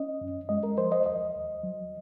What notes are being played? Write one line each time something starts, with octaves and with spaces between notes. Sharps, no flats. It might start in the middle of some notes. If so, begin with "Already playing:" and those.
Already playing: C#4 D#5
F#2
G#3 D#5
A#4
F3 C5
D#5
D#2 D#5
D#2
F#3